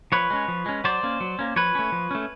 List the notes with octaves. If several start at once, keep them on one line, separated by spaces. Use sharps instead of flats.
F3 B4 C#5
G#3 C#4
F3
G#3 C#4
F#3 C5 D5
A#3 C#4
F#3
A#3 C#4
F3 B4 C#5
A3 C#4
F3
A3 C#4